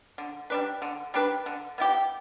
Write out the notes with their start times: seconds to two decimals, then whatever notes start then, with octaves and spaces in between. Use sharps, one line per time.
0.18 D3
0.50 G3 D4 B4
0.82 D3
1.14 G3 D4 B4
1.46 D3
1.78 B3 E4 G4